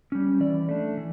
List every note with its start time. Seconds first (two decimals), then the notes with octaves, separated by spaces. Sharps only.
0.12 G3 C#4
0.40 E3 D5
0.69 A3 D4
0.97 E3